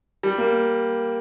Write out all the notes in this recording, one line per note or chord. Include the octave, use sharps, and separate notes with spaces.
G3
A#3